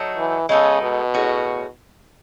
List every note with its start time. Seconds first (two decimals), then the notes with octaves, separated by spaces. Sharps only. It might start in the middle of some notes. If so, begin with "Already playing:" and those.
Already playing: F#3 A3 D#4
0.18 E3
0.49 C#3 G#3 B3 D#4 A4
0.81 B2
1.14 A2 G#3 C#4 F#4